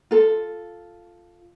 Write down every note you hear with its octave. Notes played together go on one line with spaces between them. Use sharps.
F4 A4